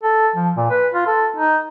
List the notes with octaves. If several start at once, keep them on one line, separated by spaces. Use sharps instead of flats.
A4
F3
A#2
B4
F4
A4
D#4